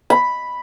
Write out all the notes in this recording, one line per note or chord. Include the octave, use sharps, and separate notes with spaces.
B5